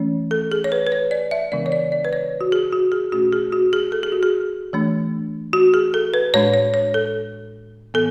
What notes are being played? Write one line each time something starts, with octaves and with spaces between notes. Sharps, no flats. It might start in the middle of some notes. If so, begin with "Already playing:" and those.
Already playing: E3 A3 C#4
A4
G#4
C#5
B4
B4
C#5
D5
E5
C#3 E3 G#3 B3 D4 D5
C#5
D5
D5
B4
C#5
F#4
G#4
F#4
G#4
B2 A3 C#4 F#4
G#4
F#4
G#4
A4
G#4
F#4
G#4
E3 A3 D4
F#4
G#4
A4
B4
A2 G#3 D4 C#5
C#5
C#5
A4
A2 E3 B3 A4